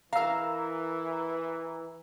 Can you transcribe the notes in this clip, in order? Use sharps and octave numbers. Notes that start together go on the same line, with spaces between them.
E3 A#4 F5 A#5 E6